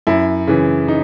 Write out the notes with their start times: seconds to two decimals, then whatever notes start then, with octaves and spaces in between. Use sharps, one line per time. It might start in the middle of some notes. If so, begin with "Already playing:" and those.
0.07 F#2 E4
0.47 C#3 E3
0.88 D#4